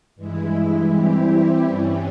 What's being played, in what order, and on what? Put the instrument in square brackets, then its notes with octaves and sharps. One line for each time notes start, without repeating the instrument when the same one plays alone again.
[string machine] G2 E3 G#3 E4
E3 G3 C4 E4 G4
G2 E3 G3 C#4